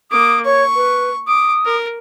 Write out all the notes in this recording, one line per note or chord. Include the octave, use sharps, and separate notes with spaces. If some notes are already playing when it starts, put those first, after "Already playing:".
A#3 D6 D#6
C#5 C#6
B4
D6 D#6
A#4